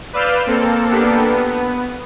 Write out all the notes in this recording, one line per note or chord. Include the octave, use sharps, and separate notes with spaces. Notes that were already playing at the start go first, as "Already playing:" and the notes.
B4 D5 F5 E6 F6 G6
A#3 C4 A4
A#3 B3 D4 G4 A4
B3